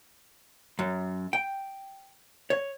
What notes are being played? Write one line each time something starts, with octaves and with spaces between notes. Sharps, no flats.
F#2
G5
C#5